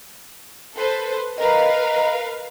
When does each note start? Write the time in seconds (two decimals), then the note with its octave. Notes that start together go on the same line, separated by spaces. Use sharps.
0.76 A4 B4 C5
1.38 A#4 B4 D#5 F5 A#5